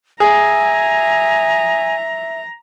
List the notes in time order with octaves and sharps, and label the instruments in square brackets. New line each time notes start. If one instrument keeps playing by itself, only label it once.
[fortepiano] G#4 [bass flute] E5 [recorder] G#5 [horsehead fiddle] A#5